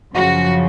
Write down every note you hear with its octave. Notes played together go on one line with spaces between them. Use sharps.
F#2 C#3 F3 F#4